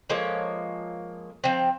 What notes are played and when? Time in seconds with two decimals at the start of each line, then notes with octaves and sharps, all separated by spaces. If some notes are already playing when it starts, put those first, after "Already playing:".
0.10 F3 G#3 A#3 C#5
1.44 F3 C4